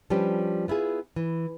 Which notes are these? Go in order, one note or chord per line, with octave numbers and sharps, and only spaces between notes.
F3 G3 C#4 D4 G4 B4
B3 E4 F4 G#4
E3